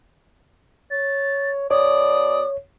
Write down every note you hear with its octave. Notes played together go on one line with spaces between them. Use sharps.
C#5 A6
B2 C#5 D5 D#6